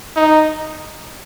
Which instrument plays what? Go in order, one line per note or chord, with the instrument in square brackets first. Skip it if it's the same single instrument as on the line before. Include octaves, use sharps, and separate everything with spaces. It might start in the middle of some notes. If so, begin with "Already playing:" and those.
[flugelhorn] D#4